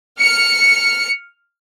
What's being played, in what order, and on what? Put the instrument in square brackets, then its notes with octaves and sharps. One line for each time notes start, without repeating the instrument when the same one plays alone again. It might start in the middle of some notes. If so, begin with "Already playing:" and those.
[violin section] F6 C#7